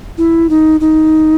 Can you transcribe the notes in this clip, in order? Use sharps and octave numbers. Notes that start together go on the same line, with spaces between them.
E4
D#4
D#4